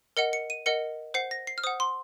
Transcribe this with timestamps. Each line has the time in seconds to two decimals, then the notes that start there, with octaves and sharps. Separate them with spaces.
0.17 A#4 D#5 F#5 C#7
0.33 C#7
0.50 D#7
0.66 A#4 D#5 F#5 C#7
1.14 C5 F#5 C7
1.31 A#6
1.47 C7
1.58 F6
1.64 C5 F#5 D#6
1.80 C6